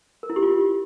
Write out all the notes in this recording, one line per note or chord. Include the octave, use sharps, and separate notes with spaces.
A#4
E4
G4
F4